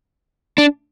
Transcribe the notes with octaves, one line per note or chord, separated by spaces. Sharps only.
D4